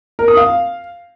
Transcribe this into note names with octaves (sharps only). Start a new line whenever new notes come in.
A#4
D#6
F5